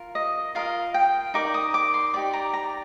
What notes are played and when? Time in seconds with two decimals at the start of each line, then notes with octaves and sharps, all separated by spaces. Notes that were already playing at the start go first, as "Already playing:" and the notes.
Already playing: F4 A#4
0.15 D#5
0.55 F4 A#4 D#5 F5
0.94 G5
1.34 D#4 A#4 D5 D6
1.54 D#6
1.74 D6
1.94 C6
2.14 D#4 G4 D5 D6
2.33 A#5
2.53 A#5